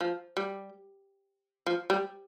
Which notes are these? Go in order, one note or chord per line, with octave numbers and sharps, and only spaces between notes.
F3
G3
F3
G3